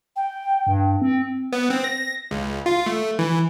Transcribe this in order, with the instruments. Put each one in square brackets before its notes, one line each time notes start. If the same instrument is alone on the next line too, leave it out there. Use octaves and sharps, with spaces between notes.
[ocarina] G5
[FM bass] G2
C4
[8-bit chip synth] B3
C4
A#6
C#2
F4
A3
E3